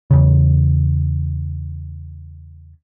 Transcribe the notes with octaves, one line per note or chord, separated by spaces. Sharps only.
E2 C#3